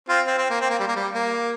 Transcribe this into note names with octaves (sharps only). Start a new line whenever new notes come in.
C4 F4
C4
C4
A#3
C4
A#3
G3
A#3
G3
A#3